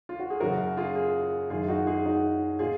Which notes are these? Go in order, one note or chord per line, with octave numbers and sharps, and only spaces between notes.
F4
F#4
G#4
F#1 F#2 C#3 F#4 A#4
F4 G#4
F4 G#4
F#1 F#2 D#3 F4 G#4
D#4 F#4
F4 G#4
D#4 F#4
A#2 F4 G#4